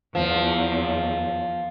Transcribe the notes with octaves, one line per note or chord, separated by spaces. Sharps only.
E2 F3